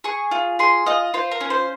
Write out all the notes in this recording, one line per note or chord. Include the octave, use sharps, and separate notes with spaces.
G#4 C#6
F4
G#4 C6
F4 D#5
F4 C5
A#4
C#4
C5